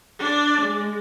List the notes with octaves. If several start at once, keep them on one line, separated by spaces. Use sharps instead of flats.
D4 D5
G#3